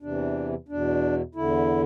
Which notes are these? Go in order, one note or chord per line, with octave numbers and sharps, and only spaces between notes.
E2 C3 E3 D4
E2 B2 D4
E2 D3 E4